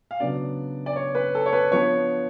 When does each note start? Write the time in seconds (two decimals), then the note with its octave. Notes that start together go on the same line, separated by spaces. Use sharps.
0.11 F5
0.20 C#3 F#3 B3 D4 D5
0.86 D5
0.96 C#5
1.15 B4
1.35 A4
1.46 C#5
1.53 B4
1.72 F3 B3 D4 C#5